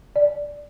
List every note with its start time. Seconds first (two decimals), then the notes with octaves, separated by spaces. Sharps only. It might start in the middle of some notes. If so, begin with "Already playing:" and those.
0.16 D5